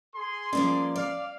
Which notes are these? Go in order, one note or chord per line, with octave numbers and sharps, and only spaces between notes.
G#4 C6
F3 A#3 C#4 D5
D5 F5